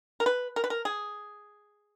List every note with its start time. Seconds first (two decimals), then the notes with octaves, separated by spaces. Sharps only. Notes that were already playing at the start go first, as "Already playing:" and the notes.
0.20 A#4
0.26 B4
0.56 A#4
0.64 B4
0.70 A#4
0.85 G#4